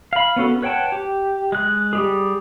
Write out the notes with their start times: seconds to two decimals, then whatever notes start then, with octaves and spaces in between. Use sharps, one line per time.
0.13 F5 B5
0.36 B3 C#4 F#4 A4
0.62 B4 C#5 F#5 G5 A5
0.92 G4
1.52 G#3 F#6
1.93 G3 G4 G#4